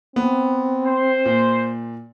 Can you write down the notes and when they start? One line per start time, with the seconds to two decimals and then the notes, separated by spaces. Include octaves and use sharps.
0.16 B3 C4
0.85 C5
1.25 A#2